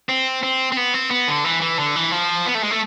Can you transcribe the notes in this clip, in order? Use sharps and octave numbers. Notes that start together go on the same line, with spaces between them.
C4
C4
C4
B3
C4
B3
D3
E3
E3
D3
E3
F3
B3
A3
G#3
A3